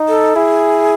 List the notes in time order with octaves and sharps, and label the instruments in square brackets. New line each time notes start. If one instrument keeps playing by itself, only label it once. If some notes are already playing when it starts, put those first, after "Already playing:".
Already playing: [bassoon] D#4
[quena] A4
[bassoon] E4 [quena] G#4